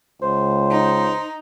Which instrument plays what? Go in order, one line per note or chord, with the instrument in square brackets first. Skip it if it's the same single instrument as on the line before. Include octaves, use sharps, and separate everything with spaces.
[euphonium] C#2 [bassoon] C5
[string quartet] D#4